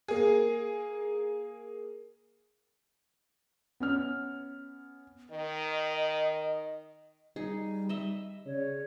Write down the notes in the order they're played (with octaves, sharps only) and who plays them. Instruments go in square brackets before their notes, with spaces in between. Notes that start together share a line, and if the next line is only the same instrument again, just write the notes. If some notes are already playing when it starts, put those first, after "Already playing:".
[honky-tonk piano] A#3 G#4
[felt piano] B3 C#4 F6
[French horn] D#3 [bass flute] D#5
[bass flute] G3 [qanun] D#4 G#4
[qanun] D#5 E5
[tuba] C#3 [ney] C#5 [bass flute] D5